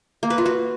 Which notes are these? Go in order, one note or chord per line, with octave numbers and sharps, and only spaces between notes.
A#3
B4
F4
F#4